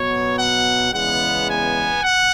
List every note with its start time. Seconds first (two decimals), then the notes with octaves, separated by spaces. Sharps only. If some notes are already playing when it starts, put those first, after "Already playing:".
Already playing: B2 F#3 B3 C#5
0.37 F#5
0.92 E2 C#3 G#3 B3 F#5
1.48 G#5
2.03 F#5